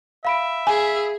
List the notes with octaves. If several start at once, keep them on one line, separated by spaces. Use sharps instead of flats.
E5 F5 B5 D7
G#4 G#5